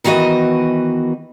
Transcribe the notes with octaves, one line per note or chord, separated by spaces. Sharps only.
D#3 E3 B3 F#4 D#5